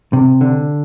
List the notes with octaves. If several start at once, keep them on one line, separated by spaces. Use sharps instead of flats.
C3
D3